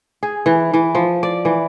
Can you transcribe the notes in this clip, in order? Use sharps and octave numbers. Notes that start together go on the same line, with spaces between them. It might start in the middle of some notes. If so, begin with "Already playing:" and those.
G#4
E3
E3
F3
D5
E3